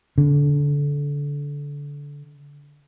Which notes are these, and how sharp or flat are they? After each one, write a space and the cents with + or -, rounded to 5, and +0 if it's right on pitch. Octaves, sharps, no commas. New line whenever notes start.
D3 -25